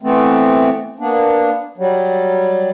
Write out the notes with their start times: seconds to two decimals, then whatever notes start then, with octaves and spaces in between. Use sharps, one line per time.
0.02 E3 A3 B3 C4
0.99 A#3 B3 D4
1.78 F#3 G3